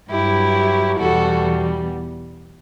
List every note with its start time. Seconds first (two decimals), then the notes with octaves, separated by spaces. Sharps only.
0.11 G2 F#3 E4 G4
0.99 E2 B2 G3 F#4 A4